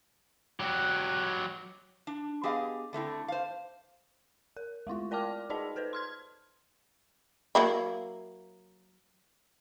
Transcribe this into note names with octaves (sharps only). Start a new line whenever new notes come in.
F#3 G4
D4
B3 G4 G#4 D#5 F5
D3 A3 C4 E4
C5 F5
A#4
G#3 A3 E4 F4
A#4 D5 G5 A5 D6 F6
D#4 G#4 D5 D#5 A5
A4 B4 C5 D5
C6 F6 G#6
F#3 A#3 E4